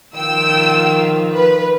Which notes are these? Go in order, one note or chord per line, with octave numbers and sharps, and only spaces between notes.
D#3 F3 F4 G5 E6
B4